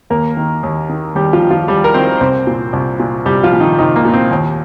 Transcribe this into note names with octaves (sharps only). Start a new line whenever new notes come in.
D#2 A#3 A#4
D#3
D#2
D#3
D#2 G3 G4
F3 F4
D#3
F3 F4
D#2 G3 G4
A#4
D#3 C4 C5
C2 C4 C5
A#2
C2
A#2
C2 G3 G4
F3 F4
A#2
D#3 D#4
C2 D#3 D#4
A#3
A#2
C4
D#2